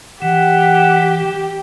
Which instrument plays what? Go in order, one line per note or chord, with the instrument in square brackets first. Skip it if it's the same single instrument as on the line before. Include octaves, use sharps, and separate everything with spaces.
[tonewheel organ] E3 [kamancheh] G4 [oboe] F#5